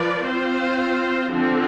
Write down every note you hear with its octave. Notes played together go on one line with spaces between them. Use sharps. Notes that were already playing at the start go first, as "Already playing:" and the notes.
Already playing: F3 B4 D5
C4 F4 C5
D3 F3 C4